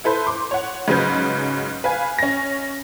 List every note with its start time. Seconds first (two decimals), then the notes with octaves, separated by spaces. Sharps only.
0.04 E4 A4 B4 C5
0.27 C6 D6
0.51 C#5 F#5
0.88 G#2 C#3 F#3 B4 G6
1.84 B4 F5 G#5
2.19 C#4 A#6